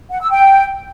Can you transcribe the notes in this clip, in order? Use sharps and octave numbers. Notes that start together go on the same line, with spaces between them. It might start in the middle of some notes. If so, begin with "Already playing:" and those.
F#5
E6
G5